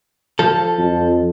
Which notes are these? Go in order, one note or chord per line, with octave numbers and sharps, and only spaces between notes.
F3 A4
F2